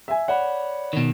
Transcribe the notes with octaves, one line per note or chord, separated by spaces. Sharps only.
E5 G#5
C#5 D5 F#5 B5
B2 D#3